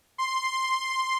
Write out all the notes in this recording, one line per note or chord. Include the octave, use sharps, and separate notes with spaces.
C6